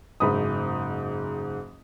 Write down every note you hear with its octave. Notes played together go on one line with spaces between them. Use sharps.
F#1 G#2 B5 D#6